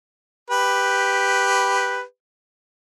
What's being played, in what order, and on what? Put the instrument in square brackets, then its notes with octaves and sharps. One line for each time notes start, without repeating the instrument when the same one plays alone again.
[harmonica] G4 B4